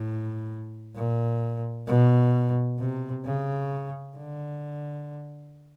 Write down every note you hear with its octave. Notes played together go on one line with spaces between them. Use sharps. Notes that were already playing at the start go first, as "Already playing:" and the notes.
Already playing: A2
A#2
B2
C3
C#3
D3